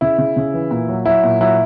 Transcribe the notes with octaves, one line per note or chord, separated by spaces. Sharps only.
C#3 E4
C#3
C#3
E3
A#2
F#3
F#3 E4
A#2
F#3 E4